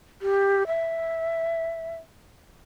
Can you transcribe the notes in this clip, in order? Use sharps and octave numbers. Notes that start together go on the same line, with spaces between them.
G4
E5